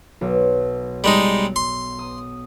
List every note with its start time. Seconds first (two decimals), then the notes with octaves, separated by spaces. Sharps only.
0.21 B1
1.04 G3 G#3 D#4
1.56 C6
1.99 D#6